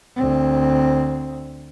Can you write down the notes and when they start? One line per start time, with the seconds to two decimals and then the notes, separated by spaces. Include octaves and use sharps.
0.17 D2 C4